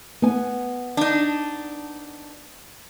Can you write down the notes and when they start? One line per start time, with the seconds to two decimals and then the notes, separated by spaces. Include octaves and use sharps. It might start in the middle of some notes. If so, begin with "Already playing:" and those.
0.22 B3 G#5
0.97 D4 D#4